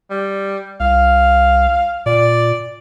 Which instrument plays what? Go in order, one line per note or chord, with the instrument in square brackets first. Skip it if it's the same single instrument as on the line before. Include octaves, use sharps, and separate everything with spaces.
[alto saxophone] G3
[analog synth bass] C2 [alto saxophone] F5
[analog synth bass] A#2 [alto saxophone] D5